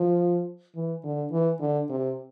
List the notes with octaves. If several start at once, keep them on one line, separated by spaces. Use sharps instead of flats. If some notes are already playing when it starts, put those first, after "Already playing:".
Already playing: F3
E3
D3
E3
D3
C3